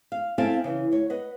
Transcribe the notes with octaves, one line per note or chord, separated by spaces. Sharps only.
F5
C4 E4 A4 F5 G#5 A5
C#3 E3
D2 C#5
B4 D#5 F#5